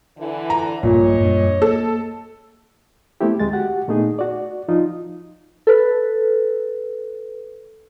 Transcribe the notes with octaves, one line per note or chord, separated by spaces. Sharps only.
D3 E3
A#5
A#1 G2 A#2 A#3 C#5 D#5
F#2 G3 D4
A#3 A4
A3 B3 C4 E4 G4
D2 G#3 A6
F#4 G4 F#5
A#2 A3 B3 D#4 G#4
F#4 D5
F3 D#4 F4
A4 B4